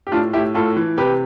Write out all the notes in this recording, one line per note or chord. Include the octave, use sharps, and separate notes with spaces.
G4
A2 D4 F4
A2 E4 G4
A2 F4 A4
E3
C3 G4 B4